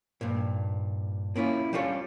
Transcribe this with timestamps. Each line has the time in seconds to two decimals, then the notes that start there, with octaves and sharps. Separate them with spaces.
0.21 G2 A#2
1.36 A#3 C#4 E4 F4
1.73 G3 C#4 D4 F4 A4 C#5